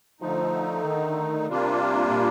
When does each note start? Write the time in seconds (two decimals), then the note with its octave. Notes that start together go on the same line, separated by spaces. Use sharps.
0.21 D3 F3 A3 D#4
0.84 D#3
1.47 C3 G3 A#3 D4 F4
2.09 A#2